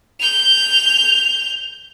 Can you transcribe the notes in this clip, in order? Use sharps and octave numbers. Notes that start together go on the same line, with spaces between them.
G6 F7